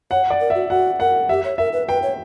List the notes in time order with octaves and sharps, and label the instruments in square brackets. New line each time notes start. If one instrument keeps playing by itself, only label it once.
[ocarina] C#5 [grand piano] F#5
[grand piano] D5
[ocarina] A#4
[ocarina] F#4 [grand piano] E5
[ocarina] F#4 [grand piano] F#5
[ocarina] A#4 [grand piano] F#5
[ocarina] G4 [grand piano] E5
[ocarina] C#5
[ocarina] A#4 [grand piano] E5
[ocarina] B4
[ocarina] B4 [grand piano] G5
[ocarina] C#5